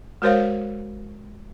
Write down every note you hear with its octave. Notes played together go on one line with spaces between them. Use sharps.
G#3 F#4 A#4 C5 C#5 F5